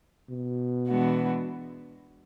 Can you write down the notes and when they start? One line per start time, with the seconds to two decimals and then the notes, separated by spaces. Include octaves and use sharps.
0.31 B2
0.88 E3 G#3 B3 D4 F#4